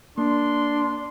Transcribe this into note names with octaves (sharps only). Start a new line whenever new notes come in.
A#3 D4 C6